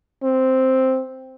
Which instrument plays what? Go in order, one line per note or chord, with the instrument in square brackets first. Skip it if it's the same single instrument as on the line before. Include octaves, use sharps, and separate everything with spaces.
[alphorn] C4